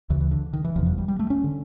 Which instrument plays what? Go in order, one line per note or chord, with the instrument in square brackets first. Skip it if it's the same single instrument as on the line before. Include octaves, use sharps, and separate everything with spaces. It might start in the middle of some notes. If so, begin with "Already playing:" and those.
[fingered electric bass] D2 C#3 E3
E3
D3
D#3
E3
F1 E2 C3 F3
F#3
G3
G3
A3
C#4
D3